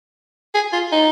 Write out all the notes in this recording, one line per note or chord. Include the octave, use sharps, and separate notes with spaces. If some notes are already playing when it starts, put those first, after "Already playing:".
G#4
F4
D#4